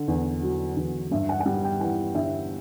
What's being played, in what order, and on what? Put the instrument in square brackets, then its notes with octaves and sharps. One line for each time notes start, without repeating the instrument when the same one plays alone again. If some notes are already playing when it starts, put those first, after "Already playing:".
Already playing: [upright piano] D3
E2
F#3
E2
G2 E5
F#5
F#5
G3 G5
G5
E3 F#5
G1 E5